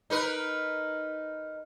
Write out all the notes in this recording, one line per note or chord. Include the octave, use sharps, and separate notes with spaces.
D#4 A#4 B4